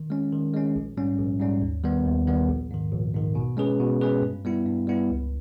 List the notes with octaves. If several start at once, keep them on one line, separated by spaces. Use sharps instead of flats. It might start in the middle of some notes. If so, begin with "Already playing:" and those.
Already playing: D#3
G#3 C#4
D#3
G#3 C#4
A#1
G#2 G3 C#4
A#1
G#2 G3 C#4
D#2
D#3 G3 B3
D#2
D#3 G3 B3
A#1
G#2 D#3
A#1
G#2 D#3
B2
G#3 C#4 G#4 B4
B2
G#3 C#4 G#4 B4
G2
G3 B3 E4
G2
G3 B3 E4
C#2